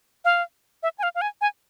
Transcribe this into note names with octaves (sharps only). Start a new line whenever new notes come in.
F5
E5
G#5
F5
F5
G#5
G#5